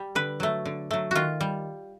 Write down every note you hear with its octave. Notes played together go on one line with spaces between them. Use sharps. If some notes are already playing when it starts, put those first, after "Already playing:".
Already playing: G3
D3 B4
F#3 A3
D3
F#3 A3
D#3 F4 F#4
G3